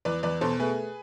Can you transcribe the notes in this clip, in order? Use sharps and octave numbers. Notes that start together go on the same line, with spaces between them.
E2 B4 D5
E2 B4 D5
B2 A4 C5
A3 G#4 B4